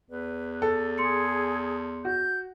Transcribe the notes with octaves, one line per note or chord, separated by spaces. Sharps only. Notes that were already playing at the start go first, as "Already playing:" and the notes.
E2 B4
A4
G#4 C6 C#7
F#4 G6